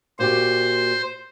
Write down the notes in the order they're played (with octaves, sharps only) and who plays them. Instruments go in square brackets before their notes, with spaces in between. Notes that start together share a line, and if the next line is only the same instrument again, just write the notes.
[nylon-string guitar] A#2 F#4 G4 [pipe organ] C5